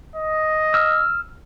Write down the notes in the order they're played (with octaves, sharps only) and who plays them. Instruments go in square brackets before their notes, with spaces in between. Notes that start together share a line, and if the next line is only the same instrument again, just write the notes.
[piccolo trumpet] D#5
[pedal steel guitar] E6 F6